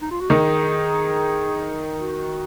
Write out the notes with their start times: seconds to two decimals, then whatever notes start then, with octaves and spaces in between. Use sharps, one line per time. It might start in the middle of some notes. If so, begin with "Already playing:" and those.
0.02 D#4
0.11 F4
0.21 F#4
0.30 D#3 D#4 G#4
1.97 F#4